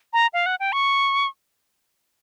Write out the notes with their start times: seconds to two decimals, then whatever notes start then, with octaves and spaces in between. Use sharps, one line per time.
0.13 A#5
0.33 F5
0.46 F#5
0.60 G5
0.72 C#6